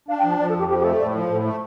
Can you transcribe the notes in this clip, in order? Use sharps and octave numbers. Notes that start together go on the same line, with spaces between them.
D4 F5
G5
F3
A5
F3 D5
A4
F2 G4
F3 G4
G4
A3 A4
A2 D5
F3 A4
A2 A4
A3